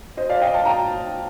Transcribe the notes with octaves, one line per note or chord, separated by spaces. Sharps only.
C5 D#5
D5 F5
D#5 G5
F5 A5
G5 A#5